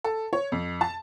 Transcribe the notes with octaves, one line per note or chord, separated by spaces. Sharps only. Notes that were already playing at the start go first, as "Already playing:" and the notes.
A4
C#5
F2
A5